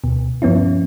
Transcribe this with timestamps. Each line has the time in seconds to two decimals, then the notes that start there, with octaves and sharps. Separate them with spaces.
0.04 D2 B2
0.42 G2 F3 B3 C#4 E4